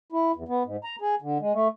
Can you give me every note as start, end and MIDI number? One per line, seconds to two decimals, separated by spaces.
0.12 0.32 64
0.36 0.44 40
0.48 0.63 59
0.65 0.77 44
0.84 0.96 82
1.01 1.15 68
1.22 1.38 50
1.40 1.53 56
1.53 1.68 57